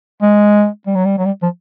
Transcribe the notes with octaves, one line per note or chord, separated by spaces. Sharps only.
G#3
G3
F#3
G3
F#3
G3
F3